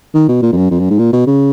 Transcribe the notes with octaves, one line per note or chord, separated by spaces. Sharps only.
D#3
B2
A#2
F2
F#2
F2
F#2
G#2
A#2
B2
C#3